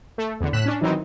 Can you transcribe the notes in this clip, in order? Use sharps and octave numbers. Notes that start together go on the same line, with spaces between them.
A3
E2 D3
A2 F#6 B6 E7
C#4 D4
D#3 E3 F#3 C4 D#4